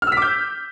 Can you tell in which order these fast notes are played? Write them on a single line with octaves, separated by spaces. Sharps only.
F6 E6 B6 D6 G6